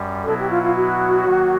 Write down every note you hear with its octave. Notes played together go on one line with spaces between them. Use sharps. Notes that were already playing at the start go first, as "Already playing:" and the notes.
Already playing: F#2 G3
B2 F#3 B3 E4 A4
G4
F4
F4
F#4
D#3 F#3 A#3